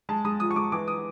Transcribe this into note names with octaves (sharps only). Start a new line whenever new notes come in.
G#3 A5
G#3 D#6
F3 D#6
C#6
G#3 D6
E3 D6
D#6